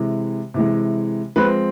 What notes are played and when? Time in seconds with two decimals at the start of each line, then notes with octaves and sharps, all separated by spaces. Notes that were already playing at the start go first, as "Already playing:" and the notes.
Already playing: C3 E3 G#3
0.54 C3 E3 G#3
1.36 F3 G#3 C4 B4